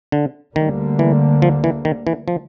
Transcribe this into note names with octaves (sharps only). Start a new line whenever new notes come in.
D3
D2 D3 D#3 G3 A#3
E3
F3
E3
D#3
E3
F3